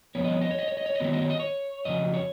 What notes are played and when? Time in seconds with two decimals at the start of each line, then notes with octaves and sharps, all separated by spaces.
0.15 F2 F3 B3 C#5
0.24 D#5
0.32 C#5
0.41 D#5
0.51 C#5
0.59 D#5
0.68 C#5
0.77 D#5
0.86 C#5
0.95 D#5
1.00 D#3 F#3 B3 C#5
1.13 D#5
1.22 C#5
1.30 D#5
1.40 C#5
1.85 F2 C#3 F#3 D#5
2.14 C#5